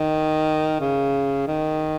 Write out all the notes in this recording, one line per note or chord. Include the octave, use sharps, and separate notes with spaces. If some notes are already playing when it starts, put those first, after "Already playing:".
Already playing: D#3
C#3
D#3